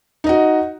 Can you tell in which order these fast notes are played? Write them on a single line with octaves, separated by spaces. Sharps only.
D#4 D#5 F#4